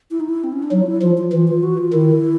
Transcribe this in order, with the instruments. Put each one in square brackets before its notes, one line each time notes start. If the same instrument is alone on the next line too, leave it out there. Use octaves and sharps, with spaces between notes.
[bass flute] E4
D#4
E4
C4
C#4
D4
[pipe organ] F#3 [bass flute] D#4
[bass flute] F4
E4
[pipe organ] F3 [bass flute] F4
[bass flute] F4
[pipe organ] E3 [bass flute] F4
[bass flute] F4
F#4
F4
[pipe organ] D#3 [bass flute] E4